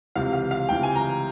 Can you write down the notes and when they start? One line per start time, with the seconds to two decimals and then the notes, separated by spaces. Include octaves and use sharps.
0.16 C#2 C3 E3 F5
0.33 F5
0.51 F5
0.69 C#2 C3 E3 G5
0.83 G#5
0.95 A#5